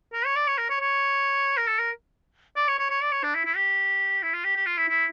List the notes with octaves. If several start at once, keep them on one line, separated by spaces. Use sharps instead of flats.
A#4
C#5
D5
C#5
A#4
C#5
C#5
A#4
A4
A#4
D5
C#5
C#5
C#5
D5
C#5
D4
E4
E4
G4
E4
F4
G4
G4
F4
E4
E4